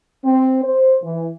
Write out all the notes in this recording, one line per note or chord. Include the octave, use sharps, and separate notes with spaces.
C4
C5
E3